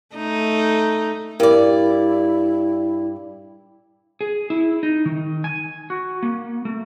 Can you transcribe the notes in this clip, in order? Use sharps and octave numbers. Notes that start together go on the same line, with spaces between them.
A3 D#4
G2 E4 A#4 D5
G#4
E4
D#4
D#3
G#5
F#4
A#3
A3